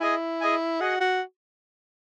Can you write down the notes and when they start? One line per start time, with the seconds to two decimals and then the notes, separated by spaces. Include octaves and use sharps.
0.01 E4 G#4 D#5 G#5
0.41 G#4 D#5 G#5
0.80 F#4 G#4 D#5 F#5
1.01 F#4